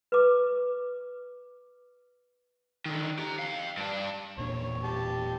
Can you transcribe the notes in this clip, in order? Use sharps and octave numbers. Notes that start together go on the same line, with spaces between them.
B4 D6
D3 D#3
G4 A#5
F5 G5
G2 D4
E1 A#2 D4 C#5
G4 A5